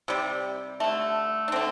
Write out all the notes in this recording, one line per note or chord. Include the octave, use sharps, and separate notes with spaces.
C3 G3
D3 A3
D4
D3 A3 C4